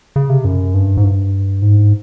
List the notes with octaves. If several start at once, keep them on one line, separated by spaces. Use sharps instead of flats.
C#3
C3
F#2
G2
G#2
G2
G#2